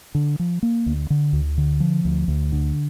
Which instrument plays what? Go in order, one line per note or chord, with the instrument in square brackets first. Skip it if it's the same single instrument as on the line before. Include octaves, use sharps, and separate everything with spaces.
[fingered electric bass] D3
F3
A#3
D2
D3
D2
D3
F3
D2
D2
D3